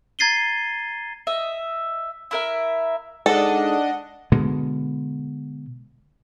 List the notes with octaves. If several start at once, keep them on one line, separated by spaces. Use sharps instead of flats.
A#5 G#6 A6 C7 D#7 G7
D#5 E5
E4 A#4 E5
G#2 D4 A4 D#5 F#5
B2 D3 G#3